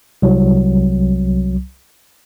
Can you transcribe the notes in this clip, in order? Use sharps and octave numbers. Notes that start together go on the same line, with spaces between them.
C2 F#3